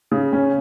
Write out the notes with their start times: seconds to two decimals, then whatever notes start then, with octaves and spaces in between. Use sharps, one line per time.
0.11 C#3
0.33 C#4